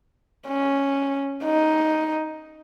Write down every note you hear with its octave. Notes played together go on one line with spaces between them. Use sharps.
C#4
D#4